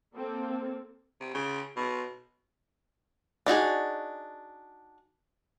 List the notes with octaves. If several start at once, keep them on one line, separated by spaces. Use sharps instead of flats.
A#3 C4 A4
C3
C#3
B2
D4 D#4 F#4 G#4